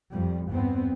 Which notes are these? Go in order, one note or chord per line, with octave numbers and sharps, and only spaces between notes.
F2 G3
E2 G2 B3 C4